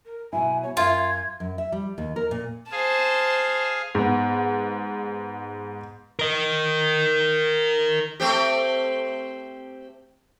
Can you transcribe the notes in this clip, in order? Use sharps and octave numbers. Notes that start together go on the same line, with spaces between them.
A#4
B2 F#3 E4 G#5
C#5
F#2 F4 E5 G#6
F#2
E5
G3
D#2
A#4
A#2
G#4 C5 F5 A5
G#2 B3
A#4 D#5
A3 C4 G4